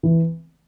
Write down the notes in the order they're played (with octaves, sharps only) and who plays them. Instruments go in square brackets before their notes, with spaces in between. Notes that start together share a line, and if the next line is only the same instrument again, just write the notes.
[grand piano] E3